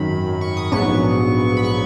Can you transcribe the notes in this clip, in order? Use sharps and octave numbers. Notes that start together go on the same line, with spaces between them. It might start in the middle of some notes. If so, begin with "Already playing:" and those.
Already playing: G#1 F#2 D#3 F#3 B5
C#6
D#6
A#1 G#2 F#3 B3 C#6
B5
C#6